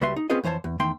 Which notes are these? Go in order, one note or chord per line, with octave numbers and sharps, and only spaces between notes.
C#2 G3 F#4 B4 E5 C6
D#4
C4 C#4 F4 G#4 B4 D#5
F2 E3 C5 C#5 A5
E2
E2 D#3 A3 G5 C6